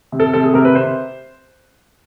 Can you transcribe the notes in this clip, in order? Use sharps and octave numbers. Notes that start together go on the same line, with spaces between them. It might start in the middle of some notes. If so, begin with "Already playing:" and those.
C3
A4
C3 A4
G#4
C3 A#4
B4
C3 C5